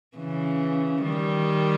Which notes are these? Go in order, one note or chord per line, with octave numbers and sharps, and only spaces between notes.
C#3 E3
D#3 G3